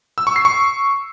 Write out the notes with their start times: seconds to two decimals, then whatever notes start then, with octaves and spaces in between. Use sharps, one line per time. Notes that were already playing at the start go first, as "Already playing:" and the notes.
0.18 E6
0.27 C#6
0.36 C7
0.45 C#6